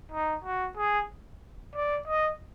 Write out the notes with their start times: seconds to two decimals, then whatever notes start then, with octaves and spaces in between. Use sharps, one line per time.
0.12 D#4
0.44 F#4
0.77 G#4
1.76 D5
2.08 D#5